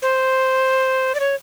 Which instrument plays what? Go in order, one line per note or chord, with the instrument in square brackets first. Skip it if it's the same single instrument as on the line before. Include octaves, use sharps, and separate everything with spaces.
[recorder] C5
D5
C#5